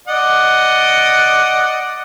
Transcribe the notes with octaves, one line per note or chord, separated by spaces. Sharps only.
D5 D#5 F#5